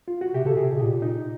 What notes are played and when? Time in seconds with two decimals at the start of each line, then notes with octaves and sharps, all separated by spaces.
0.08 F4
0.21 F#4
0.34 C3 G4
0.45 C#3 A4
0.56 C3 G#4
0.72 B2
0.79 A#2 G4
1.02 D#4